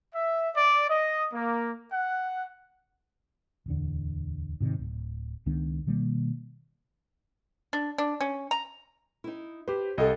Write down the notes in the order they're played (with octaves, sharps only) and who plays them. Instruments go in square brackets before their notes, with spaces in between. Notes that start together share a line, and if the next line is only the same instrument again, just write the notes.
[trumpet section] E5
D5
D#5
A#3
F#5
[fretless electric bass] D1 E2 D3
G#2 C3 D#3
D1
C#2 D#3 B3 D4
B2 D#3 G3 A#3
[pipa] D4
D4
C#4
A#5
[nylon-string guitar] D#4 E4
[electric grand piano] G4 B4 [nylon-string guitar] C5
[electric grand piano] C2 D#5 [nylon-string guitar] G4 A4